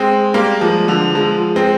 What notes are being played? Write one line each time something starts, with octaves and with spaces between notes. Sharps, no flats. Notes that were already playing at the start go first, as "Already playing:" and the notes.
Already playing: G#3 C4
G3 A#3
F3 G#3
D3 F3
F3 G#3
G#3 C4